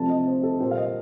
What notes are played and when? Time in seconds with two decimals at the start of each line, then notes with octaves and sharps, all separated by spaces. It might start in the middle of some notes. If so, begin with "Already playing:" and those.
Already playing: C2 C3 F3 A3 A5
0.09 D#5
0.27 C5
0.43 A4
0.60 A#2 G3 A#3 C5
0.71 F5
0.77 D#5